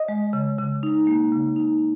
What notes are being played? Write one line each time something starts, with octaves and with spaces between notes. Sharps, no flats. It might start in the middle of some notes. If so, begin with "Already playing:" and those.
Already playing: D#5
G#3
C#3
C#3
D#4
A#3
C#3
D#4